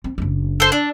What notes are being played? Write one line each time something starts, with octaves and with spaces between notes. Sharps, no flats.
C4
F#1 D4
A4 C5
D4